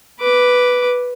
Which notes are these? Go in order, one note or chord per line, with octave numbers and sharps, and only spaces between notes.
B4 D6